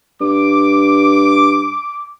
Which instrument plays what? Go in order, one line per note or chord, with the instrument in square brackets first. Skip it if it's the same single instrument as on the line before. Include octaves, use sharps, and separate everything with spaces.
[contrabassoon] G2 [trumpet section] D6